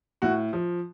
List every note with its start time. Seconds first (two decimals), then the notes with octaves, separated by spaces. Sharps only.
0.22 A2 F#4
0.53 F3